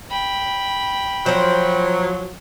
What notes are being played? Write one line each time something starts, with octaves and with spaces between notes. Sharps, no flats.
G5 B5
F3 F#3 A#4 C5